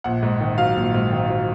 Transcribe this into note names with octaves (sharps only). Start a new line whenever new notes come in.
A#1 F#5
G#2
D#3
F#3 F5
A#1
G#2
D#3
F#3